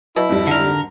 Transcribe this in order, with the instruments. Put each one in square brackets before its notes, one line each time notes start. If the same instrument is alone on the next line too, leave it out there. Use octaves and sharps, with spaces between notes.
[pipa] B2 [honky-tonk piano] F#3 [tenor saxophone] E4
[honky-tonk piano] F2 G#2 G3
[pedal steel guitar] D3 A#4